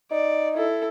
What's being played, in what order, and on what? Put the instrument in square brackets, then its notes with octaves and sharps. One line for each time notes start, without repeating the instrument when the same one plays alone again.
[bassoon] D#4 [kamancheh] D5
[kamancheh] E4 A4